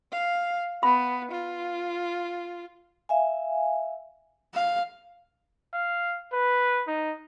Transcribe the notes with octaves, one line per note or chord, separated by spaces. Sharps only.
F5
B3 B5
F4
E5 F5 G#5
F5
F5
B4
D#4